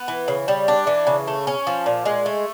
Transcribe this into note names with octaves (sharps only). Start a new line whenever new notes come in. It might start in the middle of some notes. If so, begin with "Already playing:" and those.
Already playing: B3
E3
C#3
G3
D4
E3
C#3
A3
C#4
F3
A#2
G#3
A3